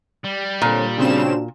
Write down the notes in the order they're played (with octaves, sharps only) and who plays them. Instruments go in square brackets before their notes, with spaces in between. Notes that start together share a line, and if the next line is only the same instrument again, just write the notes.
[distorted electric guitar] G3
[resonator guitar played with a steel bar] A#2 [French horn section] D3 C4 C#5
[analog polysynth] C#3 C4 E7 [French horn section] D4 F#4